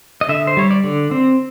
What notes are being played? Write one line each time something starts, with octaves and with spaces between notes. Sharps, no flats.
D#5
D3 E5
C5
G3 C#5
D5
D3
C4